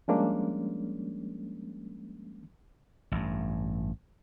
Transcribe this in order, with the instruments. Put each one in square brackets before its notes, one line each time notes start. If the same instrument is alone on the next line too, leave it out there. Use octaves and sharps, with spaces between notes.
[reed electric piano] F3 G3 G#3 A#3 C#4 D4
[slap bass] A1 G2